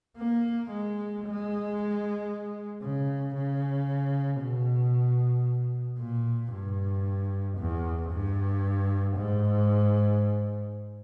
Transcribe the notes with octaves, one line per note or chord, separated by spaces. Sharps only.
A#3
G#3
G#3
C#3
C#3
B2
A#2
G2
E2
G2
G#2